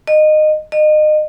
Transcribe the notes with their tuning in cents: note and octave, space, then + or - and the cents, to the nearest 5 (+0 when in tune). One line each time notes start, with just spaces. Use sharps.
D#5 -20
D#5 -30